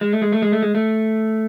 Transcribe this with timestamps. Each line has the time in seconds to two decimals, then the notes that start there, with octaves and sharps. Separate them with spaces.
0.01 G#3
0.13 A3
0.22 G#3
0.32 A3
0.42 G#3
0.52 A3
0.62 G#3
0.75 A3